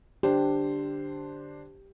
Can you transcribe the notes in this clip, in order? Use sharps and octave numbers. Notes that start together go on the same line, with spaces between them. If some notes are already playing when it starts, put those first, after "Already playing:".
D3 D4 G4 C5